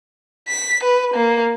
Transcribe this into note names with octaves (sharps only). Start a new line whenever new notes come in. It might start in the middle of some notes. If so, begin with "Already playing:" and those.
B6
B4
A#3